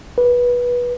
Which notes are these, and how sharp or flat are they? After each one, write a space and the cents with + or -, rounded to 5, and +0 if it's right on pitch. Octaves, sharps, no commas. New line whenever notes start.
B4 -20